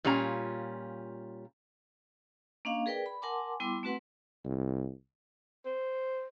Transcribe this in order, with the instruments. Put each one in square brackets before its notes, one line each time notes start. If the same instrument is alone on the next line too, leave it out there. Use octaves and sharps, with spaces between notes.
[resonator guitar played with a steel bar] A#2 G3 C#4 F4 A#5
[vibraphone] A#3 C#4 D4 D#5 F5
G#4 A#4 B4 D5 G5
B5
A#4 F#5 G#5 A5 C6 D6
G3 B3 E4 G5 C6 D6
A3 C4 F#4 B4 F#5 C6
[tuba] C2
[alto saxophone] C5